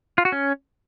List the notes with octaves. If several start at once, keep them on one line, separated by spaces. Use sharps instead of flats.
F4
F#4
C#4